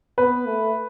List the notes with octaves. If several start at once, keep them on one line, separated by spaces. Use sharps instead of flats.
B3 B4
A3